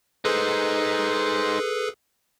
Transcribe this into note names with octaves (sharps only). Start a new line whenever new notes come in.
D#4 G#4 A4 B4 C5